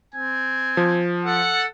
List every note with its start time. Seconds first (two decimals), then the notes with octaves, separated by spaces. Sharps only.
0.15 C4 G#5
0.77 F3
1.25 A4 F#5